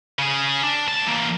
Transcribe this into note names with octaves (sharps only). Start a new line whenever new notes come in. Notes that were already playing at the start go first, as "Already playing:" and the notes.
C#3 G#4
D4
D2 A5
E3 A#3